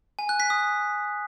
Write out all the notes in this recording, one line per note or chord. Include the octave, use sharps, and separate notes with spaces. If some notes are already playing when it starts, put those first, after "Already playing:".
G#5
F#6
B6
D#6